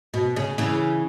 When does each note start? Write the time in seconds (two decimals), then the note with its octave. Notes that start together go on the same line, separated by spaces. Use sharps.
0.14 B2
0.36 C#3
0.58 C#3 E3